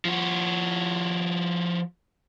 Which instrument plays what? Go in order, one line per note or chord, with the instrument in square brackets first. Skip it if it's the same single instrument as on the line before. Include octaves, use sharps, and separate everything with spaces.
[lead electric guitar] F3 F#4